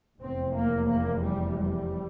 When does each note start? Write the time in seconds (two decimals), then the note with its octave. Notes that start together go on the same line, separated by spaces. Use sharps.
0.19 F1 E2 C3 C4
0.54 A#3
0.90 A#3
1.24 G3
1.58 G3